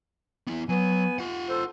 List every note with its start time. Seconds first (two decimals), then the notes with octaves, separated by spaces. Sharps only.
0.47 B3 E4
0.69 F#3 B3 G#5
1.19 F4 F#5
1.50 A4 C5